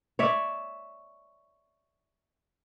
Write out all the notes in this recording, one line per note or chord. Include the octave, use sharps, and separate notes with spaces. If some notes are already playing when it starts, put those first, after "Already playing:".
C#5 D5 E5